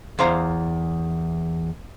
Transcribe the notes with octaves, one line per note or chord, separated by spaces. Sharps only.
E2 C5 F5 A#5